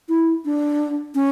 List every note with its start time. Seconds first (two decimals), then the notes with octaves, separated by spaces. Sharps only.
0.09 E4
0.45 D4
1.15 C#4